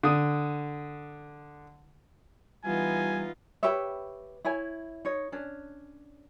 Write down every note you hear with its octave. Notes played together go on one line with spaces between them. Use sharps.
D3 D#6
E3 G3 B3 D#4 F4 G#5
G4 B4 C#5 E5
E4 C#5 G#5
D#4 C#5
C#4 D4